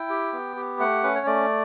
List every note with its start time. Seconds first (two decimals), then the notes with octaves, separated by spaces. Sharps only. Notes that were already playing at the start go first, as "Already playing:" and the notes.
Already playing: E4 G5
0.10 G4
0.33 B3
0.56 G4
0.79 A3 F#5
1.03 C#4 B4
1.15 C#5
1.26 A3 D5